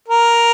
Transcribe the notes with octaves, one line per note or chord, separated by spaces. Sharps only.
A#4